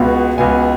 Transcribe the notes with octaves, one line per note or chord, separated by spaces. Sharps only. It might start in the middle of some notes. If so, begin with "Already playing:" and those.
Already playing: C#2 B2 B3
C#2 B2 B3 G#5